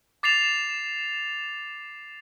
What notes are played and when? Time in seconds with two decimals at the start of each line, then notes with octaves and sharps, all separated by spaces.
0.23 D6 A6 C7 E7 F7